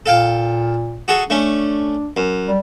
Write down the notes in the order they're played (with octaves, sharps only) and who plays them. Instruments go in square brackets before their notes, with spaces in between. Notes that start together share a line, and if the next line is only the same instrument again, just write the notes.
[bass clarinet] A#2 [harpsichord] A4 F5 G5
[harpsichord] F#4 G#4 A4
[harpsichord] A3 C#4 [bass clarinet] D4
[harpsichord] F#2
[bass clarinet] G3